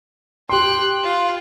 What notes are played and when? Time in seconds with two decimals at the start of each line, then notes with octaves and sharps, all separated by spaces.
0.49 G4 G5 C6 F#6
1.04 F4